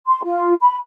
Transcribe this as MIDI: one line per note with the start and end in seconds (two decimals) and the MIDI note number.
0.07 0.21 84
0.24 0.54 65
0.61 0.76 83